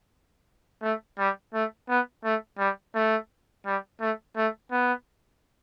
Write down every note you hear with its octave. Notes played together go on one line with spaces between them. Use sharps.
A3
G3
A3
B3
A3
G3
A3
G3
A3
A3
B3